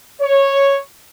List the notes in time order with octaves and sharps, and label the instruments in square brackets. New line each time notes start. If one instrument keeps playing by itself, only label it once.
[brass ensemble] C#5